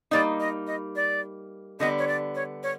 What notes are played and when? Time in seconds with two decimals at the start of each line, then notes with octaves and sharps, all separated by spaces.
0.11 G3 A#3 D#4 D5
0.40 D#5
0.67 D#5
0.96 D5
1.80 D3 G3 B3 D#5
1.99 C#5
2.08 D5
2.35 C#5
2.63 C#5